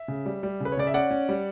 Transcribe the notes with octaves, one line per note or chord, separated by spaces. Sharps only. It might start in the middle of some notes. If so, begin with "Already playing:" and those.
Already playing: E5
C#3
G3
G3
C#3 B4
C#5
C#3 D5
E5
C#4 D5 F#5
C#4
G3